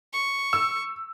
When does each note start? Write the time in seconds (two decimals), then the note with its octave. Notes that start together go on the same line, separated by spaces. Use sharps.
0.13 C#6
0.53 E6